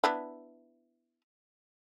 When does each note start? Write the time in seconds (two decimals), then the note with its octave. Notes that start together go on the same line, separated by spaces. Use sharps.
0.04 B3 D4 E4